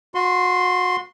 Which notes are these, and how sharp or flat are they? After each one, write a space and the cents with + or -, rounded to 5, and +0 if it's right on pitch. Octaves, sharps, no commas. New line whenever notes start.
F#4 -30 C6 +0